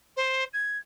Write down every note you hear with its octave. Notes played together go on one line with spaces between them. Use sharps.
C5
G#6